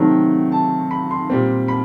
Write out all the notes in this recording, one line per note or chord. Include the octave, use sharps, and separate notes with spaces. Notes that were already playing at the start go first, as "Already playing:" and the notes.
Already playing: C3 D#3 F#3 A3 C4 G5
A5
B5
C6
A#2 G3 C4
B5